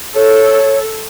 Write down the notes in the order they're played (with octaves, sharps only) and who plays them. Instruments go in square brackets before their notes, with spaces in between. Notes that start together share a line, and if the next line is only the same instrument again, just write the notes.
[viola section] A4 [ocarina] C#5